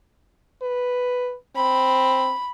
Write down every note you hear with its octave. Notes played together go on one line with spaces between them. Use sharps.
B4
C4 B5